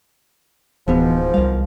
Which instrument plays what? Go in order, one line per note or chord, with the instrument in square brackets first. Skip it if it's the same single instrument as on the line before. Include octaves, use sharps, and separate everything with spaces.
[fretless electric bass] D1 [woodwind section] G#2 B2 F3 [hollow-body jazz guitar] E3 B3
[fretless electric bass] C2 G3 [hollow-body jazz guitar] A#4 F5